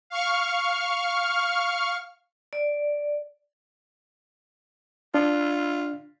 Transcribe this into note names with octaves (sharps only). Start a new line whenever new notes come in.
F5 C#6 F6
D5
D4 F4